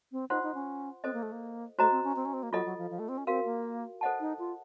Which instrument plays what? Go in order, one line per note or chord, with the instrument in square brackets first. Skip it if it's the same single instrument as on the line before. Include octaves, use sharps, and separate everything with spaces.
[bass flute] C4
[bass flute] D#4 [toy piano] F4 C5 F#5 C6
[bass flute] D#4
C#4
[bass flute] C4 [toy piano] A4 C5 D#5
[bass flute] A#3
A3
A#3
[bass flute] A3 [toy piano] F#4 C5 D#5 A#5
[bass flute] C4
C#4
C4
C#4
C4
A#3
[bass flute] F#3 [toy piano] F4 A4 D#5
[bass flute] F#3
F3
F3
A3
C4
C#4
[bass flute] C4 [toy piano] F#4 A#4 F5
[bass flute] A#3
[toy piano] A4 C5 D#5 F#5 A5
[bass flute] D#4
F4